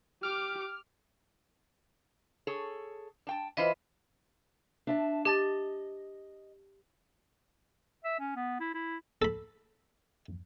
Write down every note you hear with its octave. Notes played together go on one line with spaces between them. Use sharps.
G4 D6 F6
G#4 A4 C#5
D4 G5 A5
E3 E4 F4 B4 C5 D#5
D4 E5 A5
G4 D#5 A5 A6
E5
C#4
B3
E4
E4
A4 B5